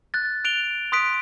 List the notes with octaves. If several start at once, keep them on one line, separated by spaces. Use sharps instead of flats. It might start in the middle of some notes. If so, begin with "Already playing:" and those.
F#6 A6
F#6 D7 F7 G7
C6 D#6 F#6 B6 D7